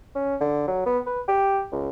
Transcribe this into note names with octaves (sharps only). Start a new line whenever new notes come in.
C#4
D3
F#3
B3
B4
G4
C#2